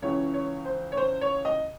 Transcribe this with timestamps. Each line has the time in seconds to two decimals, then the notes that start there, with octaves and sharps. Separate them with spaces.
0.02 C#2 C#3 E3 C#5
0.34 C#5
0.65 C5
0.92 C#5
0.97 C5
1.21 C#5
1.45 D#5